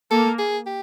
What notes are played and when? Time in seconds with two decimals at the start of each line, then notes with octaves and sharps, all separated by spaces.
0.11 A#3 A4
0.39 G#4
0.66 G4